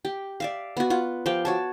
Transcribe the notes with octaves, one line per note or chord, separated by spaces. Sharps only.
G4
D5 E5 F5
B3 F#4
F4 F#5
F3 G4 F5 G5
F#4 C#5 A5